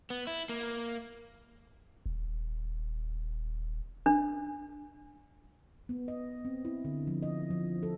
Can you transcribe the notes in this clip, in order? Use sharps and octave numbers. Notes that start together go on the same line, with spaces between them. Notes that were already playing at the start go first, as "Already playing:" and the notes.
B3
E4
A#3
D#1
D4
B3
D#5
C4
E4
D3
F3
D#5
F3
A4